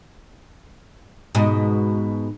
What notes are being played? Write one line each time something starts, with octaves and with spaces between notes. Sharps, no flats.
G#2 B2